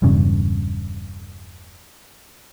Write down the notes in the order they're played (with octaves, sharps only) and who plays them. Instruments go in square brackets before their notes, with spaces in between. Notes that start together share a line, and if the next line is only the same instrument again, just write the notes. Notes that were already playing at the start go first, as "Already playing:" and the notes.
[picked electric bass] E1 E2 G2 C#3